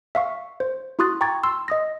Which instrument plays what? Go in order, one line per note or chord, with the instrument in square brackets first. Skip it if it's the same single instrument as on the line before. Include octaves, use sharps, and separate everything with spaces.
[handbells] E5 F5 C#6
C5
E4 F#4 C6 D#6 F#6 A6
G5 A#5 C#6 D6 G#6 A6
C6 E6
D#5 D#6 A#6